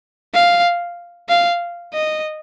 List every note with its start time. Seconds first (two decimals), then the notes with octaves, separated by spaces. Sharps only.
0.34 F5
1.29 F5
1.93 D#5